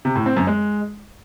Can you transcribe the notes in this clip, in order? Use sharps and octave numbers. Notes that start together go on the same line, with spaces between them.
C3
A2
C4
F#2
G#3